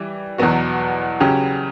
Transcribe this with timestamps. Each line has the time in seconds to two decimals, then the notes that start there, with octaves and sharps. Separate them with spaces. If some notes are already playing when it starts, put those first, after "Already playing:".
Already playing: E3 G3
0.38 E2 B2 F#3 B3 F#4
1.20 C#3 F#3 C#4 G4